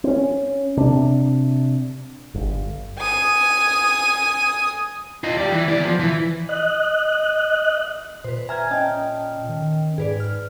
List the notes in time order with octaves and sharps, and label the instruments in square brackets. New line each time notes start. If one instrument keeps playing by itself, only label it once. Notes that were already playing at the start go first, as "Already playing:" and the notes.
[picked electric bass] C4 C#4
C3 D4
G1
[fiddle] G#5 D#6
[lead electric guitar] F4 D#5
G4 D5
E3
B3 D5
F3
E3
[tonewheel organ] D#5 F#6
[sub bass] A#2 [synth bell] B4 C5
[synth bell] E5 A#5 [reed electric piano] G#5 F6 G#6
[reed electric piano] C#4 D#5 G5 [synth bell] A5 F6
[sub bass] D#3
[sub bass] G#2 [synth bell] G#4 B4 D5
[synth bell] F6